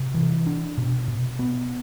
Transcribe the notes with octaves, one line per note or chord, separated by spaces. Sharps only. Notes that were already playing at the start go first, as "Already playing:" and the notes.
Already playing: C3
E3
D4
B2
B2
B3